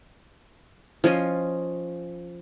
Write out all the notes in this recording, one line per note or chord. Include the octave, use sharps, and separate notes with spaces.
F3 C#4 F4 D#5